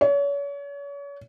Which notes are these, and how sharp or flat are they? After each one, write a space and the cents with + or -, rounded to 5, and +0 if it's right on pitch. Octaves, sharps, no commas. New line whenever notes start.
C#5 +35